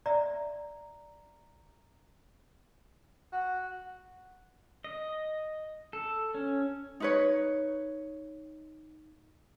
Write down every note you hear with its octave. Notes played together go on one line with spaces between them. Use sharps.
D5 E5 A#5
F#4
D#5
A4
C#4
D#4 B4 C#5